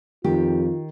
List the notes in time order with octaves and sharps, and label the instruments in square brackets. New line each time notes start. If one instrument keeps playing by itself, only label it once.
[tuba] F2 [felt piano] D#3 [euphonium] F4 [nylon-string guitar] G4